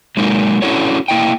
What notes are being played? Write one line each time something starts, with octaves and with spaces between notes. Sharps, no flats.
F#3 G#3 A#3 D#4
C#4 D4 E4 F#4 A4 C#5
A#3 E4 D#5 G5